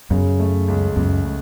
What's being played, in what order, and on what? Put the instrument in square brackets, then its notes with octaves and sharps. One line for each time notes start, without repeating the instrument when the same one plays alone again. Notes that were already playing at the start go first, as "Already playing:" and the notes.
[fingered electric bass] F#2 [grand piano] C#3
[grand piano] A3
C#2
[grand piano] C#2 [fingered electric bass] F#2
[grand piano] A3